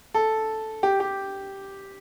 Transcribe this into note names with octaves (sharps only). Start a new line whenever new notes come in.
A4
G4
G4